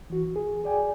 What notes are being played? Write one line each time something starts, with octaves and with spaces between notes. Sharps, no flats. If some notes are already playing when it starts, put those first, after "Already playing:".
E3 F#4
G#4
G#4 D5 G5 G#5